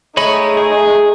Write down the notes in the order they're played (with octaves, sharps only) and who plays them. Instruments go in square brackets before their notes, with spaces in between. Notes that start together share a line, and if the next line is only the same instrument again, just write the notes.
[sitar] G#3 [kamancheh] A3 D#4 [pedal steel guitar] C#5 D#5 B5
[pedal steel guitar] G#4